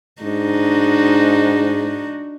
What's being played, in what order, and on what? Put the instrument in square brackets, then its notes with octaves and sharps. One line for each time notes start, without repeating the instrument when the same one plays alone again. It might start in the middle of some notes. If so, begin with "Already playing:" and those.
[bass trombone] G#2 [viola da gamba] D4 D#4 F#4